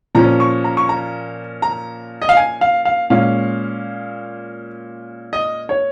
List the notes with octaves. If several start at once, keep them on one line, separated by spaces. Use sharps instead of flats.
A#2 F3 C#4 A#5
C#6
A#5
C#6
A#5
A#5
D#5
F5
G#5
F5
F5
A#2 G#3 C#4 F5
D#5
C#5